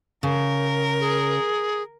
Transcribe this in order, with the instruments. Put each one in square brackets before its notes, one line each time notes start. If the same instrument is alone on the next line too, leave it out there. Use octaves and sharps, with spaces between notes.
[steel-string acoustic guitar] C#3 [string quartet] A#4
[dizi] G#4